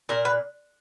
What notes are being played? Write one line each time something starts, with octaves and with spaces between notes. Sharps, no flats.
A#2 A#4
B4